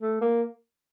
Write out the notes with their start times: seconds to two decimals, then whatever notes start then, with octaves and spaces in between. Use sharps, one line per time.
0.01 A3
0.21 A#3